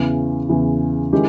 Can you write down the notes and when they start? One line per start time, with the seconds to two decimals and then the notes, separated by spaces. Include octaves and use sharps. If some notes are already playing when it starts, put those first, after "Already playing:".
Already playing: E2 C#3 E3
0.49 E2 C#3 E3
1.12 D#3 G#3 C#4 E4 G4